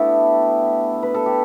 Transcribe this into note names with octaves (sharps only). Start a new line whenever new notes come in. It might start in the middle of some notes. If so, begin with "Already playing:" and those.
Already playing: A3 B3 D4 E4 G4 A4
B4
A4
G4